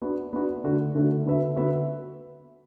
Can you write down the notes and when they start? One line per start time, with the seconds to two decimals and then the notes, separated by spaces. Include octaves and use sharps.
0.02 B3 D4 F#4
0.33 B3 D4 F#4
0.64 D3 A3 D4 F#4
0.95 D3 A3 D4 F#4
1.26 D3 B3 F#4 B4 E5
1.56 D3 B3 F#4 B4 E5